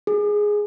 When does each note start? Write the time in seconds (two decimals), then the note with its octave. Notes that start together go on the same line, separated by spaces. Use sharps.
0.07 G#4